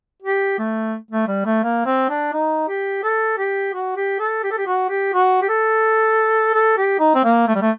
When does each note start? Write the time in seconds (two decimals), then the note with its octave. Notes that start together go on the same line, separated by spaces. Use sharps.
0.22 G4
0.58 A3
1.11 A3
1.27 G3
1.45 A3
1.63 A#3
1.86 C4
2.10 D4
2.33 D#4
2.68 G4
3.04 A4
3.38 G4
3.74 F#4
3.96 G4
4.19 A4
4.43 G4
4.51 A4
4.58 G4
4.67 F#4
4.90 G4
5.13 F#4
5.42 G4
5.49 A4
6.54 A4
6.77 G4
7.00 D#4
7.15 C4
7.24 A#3
7.48 A3
7.55 G3
7.62 A3